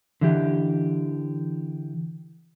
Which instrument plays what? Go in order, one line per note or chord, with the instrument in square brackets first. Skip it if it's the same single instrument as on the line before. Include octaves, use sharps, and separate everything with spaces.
[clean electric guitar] D3 E3 G4